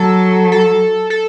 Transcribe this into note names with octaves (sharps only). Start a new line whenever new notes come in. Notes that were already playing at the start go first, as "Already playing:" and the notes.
Already playing: F#3 A4
A4
A4